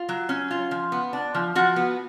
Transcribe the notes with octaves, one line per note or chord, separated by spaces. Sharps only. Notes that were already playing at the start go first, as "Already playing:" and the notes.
Already playing: F4
F#3
C#4
F4
F3
B3
D4
F3
F3 F#4
B3